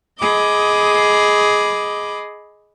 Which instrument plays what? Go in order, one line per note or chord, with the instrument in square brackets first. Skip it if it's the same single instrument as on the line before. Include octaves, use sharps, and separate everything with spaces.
[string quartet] G#4 D#5 B5 D6